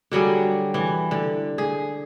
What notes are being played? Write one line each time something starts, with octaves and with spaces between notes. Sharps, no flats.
D3 F#3 G3 G#4
E3
D3
G#4